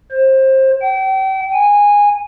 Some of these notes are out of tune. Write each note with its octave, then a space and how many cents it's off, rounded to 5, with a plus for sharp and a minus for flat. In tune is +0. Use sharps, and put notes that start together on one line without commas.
C5 +25
G5 -35
G#5 -15